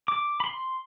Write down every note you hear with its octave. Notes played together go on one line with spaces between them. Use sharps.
D6
B5
C6